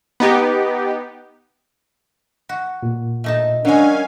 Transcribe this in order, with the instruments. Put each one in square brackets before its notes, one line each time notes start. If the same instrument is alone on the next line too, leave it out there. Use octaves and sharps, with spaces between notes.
[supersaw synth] B3 D#4 G4
[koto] F#4
[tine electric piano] A#2
[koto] A3 D#4 A5
[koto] F#3 G#3 [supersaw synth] C#4 F5 G#5 [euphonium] D4 [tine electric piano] A#4